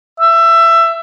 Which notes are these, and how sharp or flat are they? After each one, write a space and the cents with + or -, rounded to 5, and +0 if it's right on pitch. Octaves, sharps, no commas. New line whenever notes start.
E5 +20